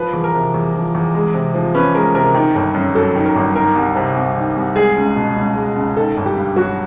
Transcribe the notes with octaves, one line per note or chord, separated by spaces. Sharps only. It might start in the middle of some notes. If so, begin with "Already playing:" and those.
Already playing: F3 B4
E2
A#4
C3
E2
F3
E2
G#3
C3
F3
C#4 B4
G#3 A#4
C3 A#4
D#3
G1
F#2
F#3 A4
D#3
A#4
G1
D#3 A#4
C2
C3
C2
D#3
C2
G#3 G#4
C#2
B2
C#2
G#3
C#2
D#3 A4
G1
G4
G2
F#3 F#4